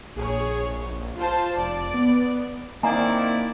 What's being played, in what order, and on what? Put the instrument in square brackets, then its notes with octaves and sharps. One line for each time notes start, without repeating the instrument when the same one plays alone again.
[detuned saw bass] A#1 [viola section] G#4 C#5
[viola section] F4 C5 A5
[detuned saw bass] F1 [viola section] D5
[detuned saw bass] B3
[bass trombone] D#3 [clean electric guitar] A#3 F5 [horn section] C4 E4 D5 [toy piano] G#5 A#5